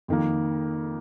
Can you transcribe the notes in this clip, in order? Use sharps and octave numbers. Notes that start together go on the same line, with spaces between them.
F2 D#3 A#3